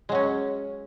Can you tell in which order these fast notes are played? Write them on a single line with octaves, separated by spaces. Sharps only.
G#3 F#3 C#4